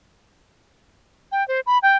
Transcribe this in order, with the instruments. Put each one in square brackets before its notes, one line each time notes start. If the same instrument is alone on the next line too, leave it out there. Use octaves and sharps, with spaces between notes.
[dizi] G5
C5
B5
G5